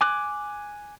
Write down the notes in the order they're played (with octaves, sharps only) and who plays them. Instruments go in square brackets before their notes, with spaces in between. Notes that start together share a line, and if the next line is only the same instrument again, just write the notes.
[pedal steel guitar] G#5 D6 F#6